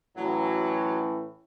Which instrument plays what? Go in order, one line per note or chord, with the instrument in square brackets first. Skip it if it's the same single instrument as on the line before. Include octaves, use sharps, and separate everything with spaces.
[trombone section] A2 E3 C#4 [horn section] F#3